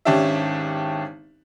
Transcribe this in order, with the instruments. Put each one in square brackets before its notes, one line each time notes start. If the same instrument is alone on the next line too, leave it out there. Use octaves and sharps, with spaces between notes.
[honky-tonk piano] G#1 C#4 D4 G4 E5